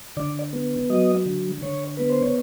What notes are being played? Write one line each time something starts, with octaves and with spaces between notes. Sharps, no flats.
D3 D5
B3
F#3 D#5
D3
D3 C#5
B3 B4
C5
C#5